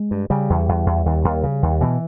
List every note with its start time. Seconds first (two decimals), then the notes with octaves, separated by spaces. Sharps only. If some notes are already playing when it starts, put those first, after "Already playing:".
Already playing: G#3
0.11 G2
0.30 C#3 G3
0.50 E2
0.69 E2
0.86 E2
1.06 D#2
1.25 D#2
1.43 C#3
1.63 D#2
1.81 B2 E3